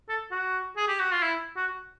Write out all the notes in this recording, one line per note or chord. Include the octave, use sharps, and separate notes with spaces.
A4
F#4
G#4
G4
F#4
F4
E4
F#4